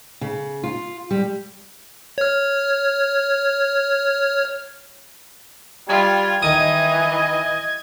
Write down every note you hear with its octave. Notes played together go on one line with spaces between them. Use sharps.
C#3
F4
G3
C#5 F6
G3 F4 G#6
D#3 E3 D#5 D#6